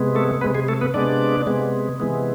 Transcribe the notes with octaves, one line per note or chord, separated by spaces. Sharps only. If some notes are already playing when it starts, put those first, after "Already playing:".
Already playing: C3 G#3 B3
A3 A4
B3 B4
C3 G#3
G#3 G#4
A3 A4
B3 B4
C3 G#3 B3 D4 D5
C3 G#3 B3
C3 E3 G#3 B3